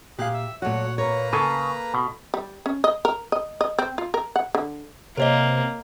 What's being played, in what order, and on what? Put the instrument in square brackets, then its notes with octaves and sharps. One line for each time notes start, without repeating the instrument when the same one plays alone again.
[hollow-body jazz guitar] A#2 F5 [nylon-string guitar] G4 [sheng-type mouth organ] G#4 F#6
[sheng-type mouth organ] E5
[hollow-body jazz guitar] A#2 F#4 [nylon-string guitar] F#3 A3 [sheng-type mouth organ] C#5 F#5
[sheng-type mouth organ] A#3 B4 A#5 [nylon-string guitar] C#5
[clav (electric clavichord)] C#3 [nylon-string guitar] A4 [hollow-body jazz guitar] G#5 A5
[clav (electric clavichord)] B2
[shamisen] G3
C#4
D#5
A#4
D#5
D#5
C4
F4
A#4
F#5
D3
[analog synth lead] C3 [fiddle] A#3 [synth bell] A#4 C#5 D#5